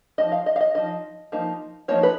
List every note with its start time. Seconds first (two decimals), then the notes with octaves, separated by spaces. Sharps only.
0.18 F3 A#3 D#4 D#5
0.32 F5
0.46 D#5
0.56 F5
0.61 D#5
0.74 F3 A#3 D#4 D#5
1.32 F3 A#3 D#4
1.88 F3 A#3 D#4 C#5
2.03 B4